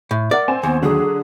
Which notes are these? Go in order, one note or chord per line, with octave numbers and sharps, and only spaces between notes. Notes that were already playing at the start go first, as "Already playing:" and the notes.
A2
A#4 D5 E5 F#5
C4 G#5 E7
D#2 B3
D3 F#3 D4 G#4